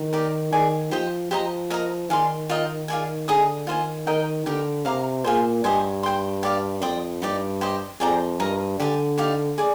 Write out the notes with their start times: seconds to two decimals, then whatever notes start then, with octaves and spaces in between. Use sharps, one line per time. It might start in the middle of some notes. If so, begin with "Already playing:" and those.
Already playing: D#3
0.13 D#4 G4 A#4 D5
0.52 D#3 G#4 D5 G#5
0.91 F3 G4 C5 D#5 G5
1.31 F3 G4 C5 D#5 A#5
1.70 A#4 D#5 A#5
2.10 D#3 G#4 D5 F5 C6
2.49 F4 A#4 D#5 G5
2.88 F4 G#4 D5 G#5
3.28 D3 G#4 D#5 A#5 D#6
3.67 D#3 F4 C5 D#5 G#5
4.07 D#3 A#4 D#5 G5
4.46 D3 D#4 G4 A#4
4.85 C3 A#4 F5 A#5 D6
5.24 A#2 F4 G#4 C5
5.64 G2 G4 C5 D#5 G#5
6.03 C5 G5 C6
6.43 G4 D5 F5
6.82 F2 D5 G5 C6 D#6
7.22 G2 D#4 G4 D5
7.61 G4 C5 D#5
8.00 F2 G#4 D5 G5 A#5
8.40 G2 A#4 D#5 A#5
8.79 D3 G4 D5 G#5
9.18 D#4 G4 D5 F5
9.58 G#4 D5